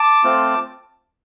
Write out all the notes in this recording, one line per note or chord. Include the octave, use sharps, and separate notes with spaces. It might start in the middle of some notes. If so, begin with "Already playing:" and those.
Already playing: A5 D6
A3 C4 F4